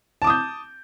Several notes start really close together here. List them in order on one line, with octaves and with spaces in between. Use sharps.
A5 D6 D#6 G6